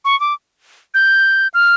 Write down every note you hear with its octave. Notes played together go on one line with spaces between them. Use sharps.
C#6
D6
G6
F6